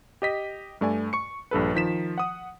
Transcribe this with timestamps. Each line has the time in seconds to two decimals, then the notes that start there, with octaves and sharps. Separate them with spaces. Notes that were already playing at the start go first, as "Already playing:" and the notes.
0.22 G4 D#5 B6
0.81 G2 A3 D5 G#5
1.13 C#6 C#7
1.51 A#1 G2 A4 B4
1.74 D#3 F3 B6 E7
2.18 F#5 D#6